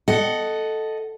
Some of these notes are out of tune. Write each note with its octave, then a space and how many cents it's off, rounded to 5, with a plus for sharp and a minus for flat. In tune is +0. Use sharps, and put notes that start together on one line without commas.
A4 +0 D#5 +0 F#5 +10